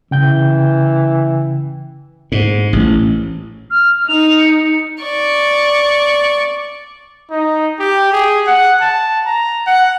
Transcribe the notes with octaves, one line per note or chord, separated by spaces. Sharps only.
C#3 E3 G5 G6
G#2
A1
F6
D#4 F7
C#7
D5 C#6
D#4
G4
G#4
F#5
A5
A#5
F#5